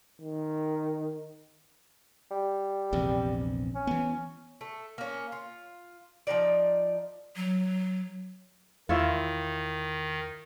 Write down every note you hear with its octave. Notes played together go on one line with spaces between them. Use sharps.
D#3
G3
A#1 E2 C3
C#4
E3 B3
A3
A#3 C#4
F4
F3 C#4 D#4 D5
F#3
E2 D#3 E4 F4 C#5 E5 C6